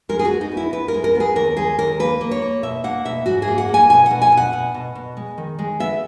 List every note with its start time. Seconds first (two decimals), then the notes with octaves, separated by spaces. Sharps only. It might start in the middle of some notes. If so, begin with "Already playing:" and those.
0.09 G#3 A#4
0.19 G#4
0.25 F#4
0.30 B3
0.41 D#4
0.52 B3
0.57 E4
0.72 B3 B4
0.88 A#4
0.94 G#3
1.04 A#4
1.15 B3
1.20 G#4
1.36 D#2 A#4
1.57 G#3 G#4
1.79 D#2 A#4
1.99 A#3 B4
2.21 A#3
2.31 C#5
2.42 A#3
2.63 B2 E5
2.84 A#3 F#5
3.05 B2 E5
3.26 G#2 F#4
3.42 G#4
3.48 A#3
3.58 F#5
3.68 A#3
3.74 G#5
3.90 B2 G#5
4.06 B2 F#5
4.22 G#5
4.32 B2
4.37 F#5
4.53 B2
4.74 B2
4.95 B2
5.17 G#3
5.38 D#3
5.59 G#3
5.80 B3 E5